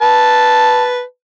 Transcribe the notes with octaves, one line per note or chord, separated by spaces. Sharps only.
B4 A5